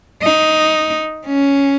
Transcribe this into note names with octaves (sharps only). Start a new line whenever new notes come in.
D#4
C#4